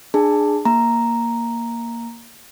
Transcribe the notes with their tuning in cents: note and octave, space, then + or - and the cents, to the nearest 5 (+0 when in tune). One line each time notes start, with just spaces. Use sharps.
D4 +25 G#4 +0 A5 +15
A#3 +0 A#5 +0